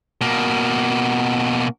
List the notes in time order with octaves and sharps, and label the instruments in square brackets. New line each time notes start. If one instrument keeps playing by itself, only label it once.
[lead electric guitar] B2 A#3